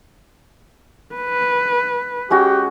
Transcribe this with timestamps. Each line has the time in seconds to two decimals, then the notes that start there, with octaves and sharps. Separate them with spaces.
1.15 B4
2.30 G#3 C#4 F#4 G4